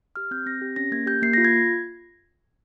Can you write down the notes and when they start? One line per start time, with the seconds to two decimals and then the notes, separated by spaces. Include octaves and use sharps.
0.16 G4 F6
0.31 C4 G6
0.46 C4 A#6
0.61 G4
0.76 C#4 A#6
0.92 A#3 G#6
1.06 G4 G6
1.22 A#3 C7
1.33 F4 A#6
1.45 G#6